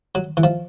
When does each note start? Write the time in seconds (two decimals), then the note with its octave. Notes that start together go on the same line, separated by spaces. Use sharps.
0.15 F#3
0.37 E3
0.44 F3